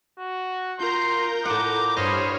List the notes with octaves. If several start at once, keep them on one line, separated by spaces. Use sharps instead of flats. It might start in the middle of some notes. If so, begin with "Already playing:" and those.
F#4
F4 A#4 A#5 C6 G6
A2 F#5 D6
G2 C5 C#5 D#5 B5 D#6 F6